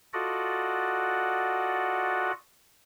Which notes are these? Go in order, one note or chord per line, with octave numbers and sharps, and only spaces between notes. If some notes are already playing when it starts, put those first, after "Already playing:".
F4 F#4 A4 D5 D#5 F#5